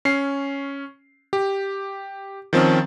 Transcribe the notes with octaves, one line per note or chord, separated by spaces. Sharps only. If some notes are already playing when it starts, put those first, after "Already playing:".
C#4 C7
G4
D#3 F3 C4 C#4